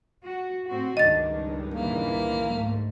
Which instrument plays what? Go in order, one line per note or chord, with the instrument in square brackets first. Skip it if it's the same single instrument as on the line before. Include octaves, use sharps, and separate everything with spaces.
[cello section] F#4
A2 C4 F#4
[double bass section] C#2 G2 D#3 [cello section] D4 [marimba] D#5 A6
[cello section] A#2 E3 [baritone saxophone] A#3
[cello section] G#2 A3